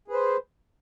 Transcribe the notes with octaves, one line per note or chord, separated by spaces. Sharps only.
G#4 B4 C5